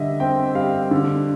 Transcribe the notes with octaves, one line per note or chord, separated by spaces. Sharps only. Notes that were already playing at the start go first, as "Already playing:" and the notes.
Already playing: D3 G3 D#5 E5
C4 G5
G3 F5
D3